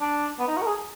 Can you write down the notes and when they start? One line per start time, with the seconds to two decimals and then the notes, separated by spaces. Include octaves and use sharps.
0.01 D4
0.39 B3
0.48 D#4
0.57 F#4
0.62 A#4
0.66 G#4